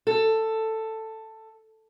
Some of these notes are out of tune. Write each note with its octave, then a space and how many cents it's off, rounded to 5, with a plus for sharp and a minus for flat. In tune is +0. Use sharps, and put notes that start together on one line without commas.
A4 +10